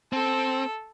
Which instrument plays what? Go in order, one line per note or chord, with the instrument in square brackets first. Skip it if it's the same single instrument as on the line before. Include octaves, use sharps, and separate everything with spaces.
[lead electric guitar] C4 [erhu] A4